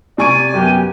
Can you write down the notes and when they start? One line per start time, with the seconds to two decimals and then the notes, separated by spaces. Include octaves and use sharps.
0.18 C3 D5 G#5 C#6 D7
0.54 F#2 B3 G4